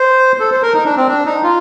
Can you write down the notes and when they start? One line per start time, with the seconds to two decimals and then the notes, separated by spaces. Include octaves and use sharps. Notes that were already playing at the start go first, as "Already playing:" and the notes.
Already playing: C5
0.40 A4
0.52 C5
0.63 A#4
0.74 D#4
0.85 D4
0.97 C4
1.08 D4
1.26 D#4
1.43 F4